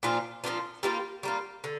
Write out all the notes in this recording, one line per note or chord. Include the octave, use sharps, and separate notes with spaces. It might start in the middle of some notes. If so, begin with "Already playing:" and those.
A#2 F3 D4 F4
A#2 F3 D4 F4
G3 A#3 F4
G3 A#3 F4
D3